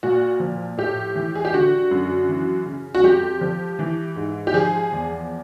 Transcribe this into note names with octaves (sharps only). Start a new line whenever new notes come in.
A#2 F#4
F3
A2 G4
E3
G#4
G4
D3 F#4
F#2
E3
C#3
F#4
F2 G4
F3
E3
G#2
G4
F3 G#4
E2